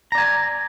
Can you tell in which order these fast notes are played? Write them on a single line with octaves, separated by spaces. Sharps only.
A#5 D5 G#5